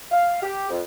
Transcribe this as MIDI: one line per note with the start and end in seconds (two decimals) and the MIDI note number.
0.11 0.42 77
0.43 0.67 67
0.70 0.81 41